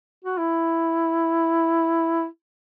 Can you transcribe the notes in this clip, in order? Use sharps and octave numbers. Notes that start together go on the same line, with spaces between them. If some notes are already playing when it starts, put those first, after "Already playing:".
F#4
E4